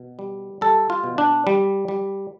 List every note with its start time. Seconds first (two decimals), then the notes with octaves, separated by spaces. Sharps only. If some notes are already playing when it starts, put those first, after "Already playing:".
Already playing: B2
0.19 G3
0.61 G3 A4
0.90 F4
1.04 B2
1.18 D4
1.47 G3
1.88 G3